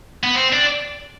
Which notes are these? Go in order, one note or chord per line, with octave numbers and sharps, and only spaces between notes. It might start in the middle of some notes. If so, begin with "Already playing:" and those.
B3
C4
D4